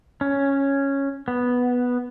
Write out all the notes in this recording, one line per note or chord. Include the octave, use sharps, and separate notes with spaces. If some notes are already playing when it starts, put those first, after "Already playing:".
C#4
B3